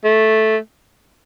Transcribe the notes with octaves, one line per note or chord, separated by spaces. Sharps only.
A3